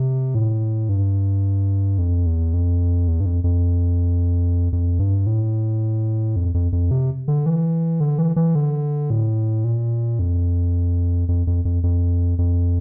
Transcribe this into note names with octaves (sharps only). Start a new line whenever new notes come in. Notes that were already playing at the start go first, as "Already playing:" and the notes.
Already playing: C3
A2
G2
F2
E2
F2
E2
G2
F2
F2
F2
G2
A2
F2
F2
F2
C3
D3
E3
D3
E3
E3
D3
A2
A#2
F2
F2
F2
F2
F2
F2